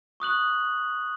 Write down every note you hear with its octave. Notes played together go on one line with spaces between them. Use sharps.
C#6 D#6 F#6 F#7